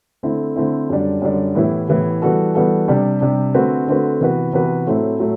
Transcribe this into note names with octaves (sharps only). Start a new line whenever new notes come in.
D3 A3 C4 E4
D3 A3 C4 E4
F#2 D3 G3 D4
F#2 D3 G3 D4
A2 E3 B3 E4 G4
A2 E3 B3 E4 G4
E3 G3 B3 F#4 A4
E3 G3 B3 F#4 A4
C3 G3 D4
C3 G3 D4
D3 A3 C4 F#4 B4
D3 A3 C4 F#4 B4
C3 E3 B3 F#4 B4
C3 E3 B3 F#4 B4
A2 F#3 A3 C4 E4
A2 F#3 A3